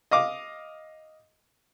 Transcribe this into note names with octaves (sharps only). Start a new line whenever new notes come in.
D#5 F5 D6